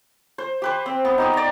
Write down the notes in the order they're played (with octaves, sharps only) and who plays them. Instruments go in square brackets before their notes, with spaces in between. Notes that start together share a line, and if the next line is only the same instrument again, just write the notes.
[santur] C5
G4 B4 C5
C4
B3
D#4 G4 C5
D5 A#5